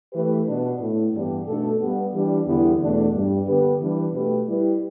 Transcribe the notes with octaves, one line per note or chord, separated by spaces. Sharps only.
E3 A3 G4 B4
B2 B3 D4 B4
A2 A3 E4
G2 E3 B3 D4 G4
B2 A3 D4 A4
G2 G3 B3
E3 G3 D4 G4
E2 D3 G3 B3 E4
E2 B2 A3 D4
G2 G3 D4
D3 B3 G4 B4
E3 G3 D4 B4
B2 A3 G4 B4
G3 E4 G4 B4